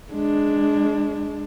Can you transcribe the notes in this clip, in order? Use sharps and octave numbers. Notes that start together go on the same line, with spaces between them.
G#3 D4